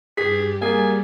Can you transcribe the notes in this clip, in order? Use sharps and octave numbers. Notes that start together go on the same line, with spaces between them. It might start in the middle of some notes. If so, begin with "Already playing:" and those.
G2 G4 G#4 B6
G3 A#3 G#4 G#5